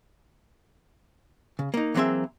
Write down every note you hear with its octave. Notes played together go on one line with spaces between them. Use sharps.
C#3
A#3 D#4
E3 F#3 A#3 C4 G#4 E5